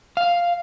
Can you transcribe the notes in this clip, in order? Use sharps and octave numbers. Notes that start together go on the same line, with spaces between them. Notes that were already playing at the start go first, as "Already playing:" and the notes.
F5